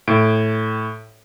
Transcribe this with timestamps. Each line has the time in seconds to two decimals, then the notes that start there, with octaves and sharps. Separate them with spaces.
0.08 A2 D7